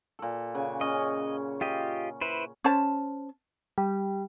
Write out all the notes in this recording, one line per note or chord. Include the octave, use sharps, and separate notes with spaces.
A#2 A4
C#3 F#5 G#5
C#4 D#5
F4 G4 D#5
E4 B4 C5
C#4 C5 A5
G3